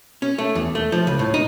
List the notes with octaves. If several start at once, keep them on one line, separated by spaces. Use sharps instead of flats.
C#4
A3
E2
A3
F3
C#2
A2
D#4